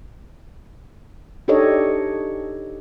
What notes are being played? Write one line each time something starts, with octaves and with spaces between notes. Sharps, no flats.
D4 D#4 G4 A4 C#5 D#5